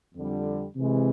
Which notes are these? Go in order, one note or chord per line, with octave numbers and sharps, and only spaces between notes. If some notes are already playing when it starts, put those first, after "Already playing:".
F2 D3 G3
C3 E3 G#3